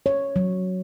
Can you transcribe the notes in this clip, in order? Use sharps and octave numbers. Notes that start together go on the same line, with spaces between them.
C#5
F#3